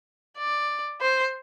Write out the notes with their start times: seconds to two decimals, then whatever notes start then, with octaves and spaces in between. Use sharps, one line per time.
0.38 D5
1.01 C5